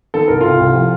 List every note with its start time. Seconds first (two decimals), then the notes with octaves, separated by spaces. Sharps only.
0.14 D#3 A4
0.28 C2 A#4
0.41 C3 F4 A4
0.60 C2
0.74 F3